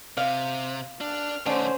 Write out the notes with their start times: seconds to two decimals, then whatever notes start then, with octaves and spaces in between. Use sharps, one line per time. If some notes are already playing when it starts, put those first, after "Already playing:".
0.17 C3 F5
1.01 D4 F6
1.46 D3 D#3 A3 C#4 D4 C5